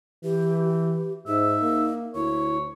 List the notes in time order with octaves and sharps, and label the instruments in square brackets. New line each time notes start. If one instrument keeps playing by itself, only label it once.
[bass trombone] E3 [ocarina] G4
[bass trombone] G#2 [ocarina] D#4 [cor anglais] E5
[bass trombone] A#3
[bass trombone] D2 [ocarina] E4 [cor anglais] C#5